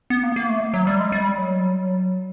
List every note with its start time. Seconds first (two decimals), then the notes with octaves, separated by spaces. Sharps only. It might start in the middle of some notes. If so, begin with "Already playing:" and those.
0.10 B3
0.23 A#3
0.36 A#3
0.49 A3
0.74 F#3
0.87 G3
1.00 G#3
1.12 G3
1.38 F#3